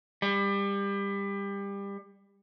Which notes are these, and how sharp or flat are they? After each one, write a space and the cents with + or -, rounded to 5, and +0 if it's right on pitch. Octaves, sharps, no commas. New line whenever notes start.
G3 +25